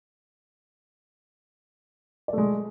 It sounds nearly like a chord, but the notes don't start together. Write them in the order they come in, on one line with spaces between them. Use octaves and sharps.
D5 A3 G#3